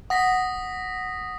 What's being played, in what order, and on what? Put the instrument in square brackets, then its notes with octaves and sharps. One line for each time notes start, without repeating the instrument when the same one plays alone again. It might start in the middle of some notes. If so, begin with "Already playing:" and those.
[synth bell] F#5 [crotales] D#6 A#6 B6